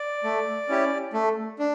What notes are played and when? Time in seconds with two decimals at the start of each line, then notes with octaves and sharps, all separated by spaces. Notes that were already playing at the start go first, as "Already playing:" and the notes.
Already playing: D5
0.24 A3
0.69 C#4 E4 G4
1.13 A3
1.59 D4